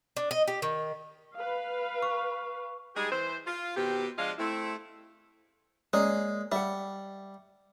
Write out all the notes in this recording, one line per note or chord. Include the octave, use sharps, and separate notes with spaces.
D4
D#5
G4
D#3
B4 F5
C#6
G3 G#3 D#4 G4 G#4
E3 C5
F4
B2 D#3 C4 G4
F3 G#3 D4 F4 D#5 F5
A3 C4 E4
G#3 A#3 C#4 D5
G3 E5 F#5